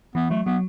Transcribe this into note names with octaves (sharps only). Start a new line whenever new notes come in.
E3 B3
F#3 A3
F#3 B3